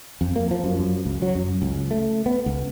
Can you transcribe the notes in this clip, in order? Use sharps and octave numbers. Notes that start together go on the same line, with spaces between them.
F2
A#3
F3
F#2
F#2
C#2
F#3
F#2
C#2
A3
B3
C#2